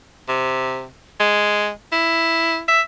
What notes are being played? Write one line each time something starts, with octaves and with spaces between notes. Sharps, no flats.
C3
G#3
E4
E5